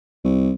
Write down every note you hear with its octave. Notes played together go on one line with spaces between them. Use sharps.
C2